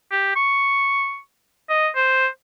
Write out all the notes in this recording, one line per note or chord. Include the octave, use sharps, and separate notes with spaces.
G4
C#6
D#5
C5